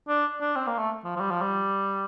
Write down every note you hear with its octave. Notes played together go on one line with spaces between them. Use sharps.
D4
D4
C4
A#3
A3
F3
F3
G3
F3
G3